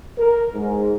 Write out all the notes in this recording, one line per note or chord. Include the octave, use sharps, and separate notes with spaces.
A#4
G#2